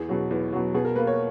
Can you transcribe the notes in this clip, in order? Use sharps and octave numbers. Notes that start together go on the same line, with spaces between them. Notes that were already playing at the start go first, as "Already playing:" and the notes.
Already playing: E2 G#4
B2 F#3
E2
B2 F#3
B2 G#4
A#4
A#3 B4
C#5